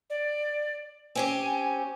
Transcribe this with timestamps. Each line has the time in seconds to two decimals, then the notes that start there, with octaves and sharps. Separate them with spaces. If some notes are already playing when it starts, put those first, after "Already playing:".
0.10 D5
1.15 C4 C#4 G4 G#5